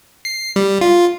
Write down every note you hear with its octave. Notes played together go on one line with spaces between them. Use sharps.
C7
G3
F4